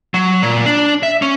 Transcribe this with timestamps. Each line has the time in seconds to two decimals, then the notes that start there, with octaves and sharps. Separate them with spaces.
0.14 F#3
0.43 A#2
0.66 D4
1.03 E5
1.22 C#4